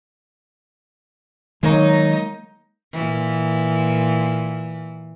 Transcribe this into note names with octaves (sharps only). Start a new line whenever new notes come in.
D#3 F#3 G#3 A#3 D#4 C#5
A#2 E3